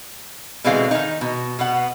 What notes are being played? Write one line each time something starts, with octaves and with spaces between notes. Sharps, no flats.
B2 D3 E3 G#3 C4 F5
D#3 D#4
B2
B2 B3 F#5